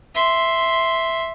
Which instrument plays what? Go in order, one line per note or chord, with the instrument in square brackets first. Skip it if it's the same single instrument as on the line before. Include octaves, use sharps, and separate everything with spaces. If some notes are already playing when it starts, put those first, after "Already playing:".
[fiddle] E5 C6